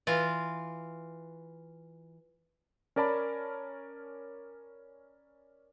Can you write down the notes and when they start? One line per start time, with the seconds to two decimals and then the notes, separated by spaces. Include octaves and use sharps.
0.07 E3 F4
2.96 C#4 A#4 D5 A5 B5